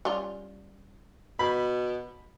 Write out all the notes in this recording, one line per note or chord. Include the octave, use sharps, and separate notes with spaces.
G3 C#4 F4
B2 B5